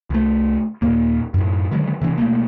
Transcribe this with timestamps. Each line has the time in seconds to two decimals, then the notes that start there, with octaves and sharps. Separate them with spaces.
0.10 C2 A3
0.82 D#2 A#2 A#3
1.34 F#2 A2
1.71 D3 D#3 F#3 G#3
2.01 C3 E3 B3 C#4
2.18 B2 G3 A3 A#3